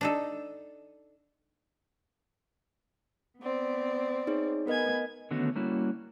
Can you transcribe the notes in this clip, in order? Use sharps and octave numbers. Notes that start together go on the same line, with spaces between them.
D4 D#4 A4
B3 C4 D5
D#4 G#4 C#5
B3 A#4 B4 D#5 G#5 G#6
D3 D#3 A3 B3 C#4 F#4
G3 A#3 C#4 E4 F#4